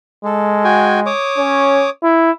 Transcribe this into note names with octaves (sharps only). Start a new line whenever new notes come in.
G#3 A4
F#4 G5 G#5
C#5 D6 D#6
C#4
E4